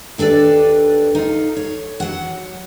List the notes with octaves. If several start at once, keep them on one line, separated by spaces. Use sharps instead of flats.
D#2 D4 A4 B4 D5
D#4 F4
C#5
F#3 F#5